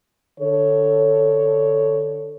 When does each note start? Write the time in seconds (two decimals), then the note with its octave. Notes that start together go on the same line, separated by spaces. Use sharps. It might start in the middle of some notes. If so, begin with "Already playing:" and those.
0.40 D3 A4 C#5